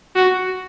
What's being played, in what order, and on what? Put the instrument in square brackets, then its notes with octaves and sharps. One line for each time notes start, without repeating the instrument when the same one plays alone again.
[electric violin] F#4